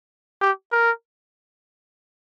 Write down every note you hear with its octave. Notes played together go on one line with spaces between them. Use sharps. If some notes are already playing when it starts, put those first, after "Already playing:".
G4
A#4